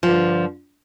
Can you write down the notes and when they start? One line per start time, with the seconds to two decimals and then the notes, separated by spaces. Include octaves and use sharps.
0.03 F3
0.05 G2
0.08 D3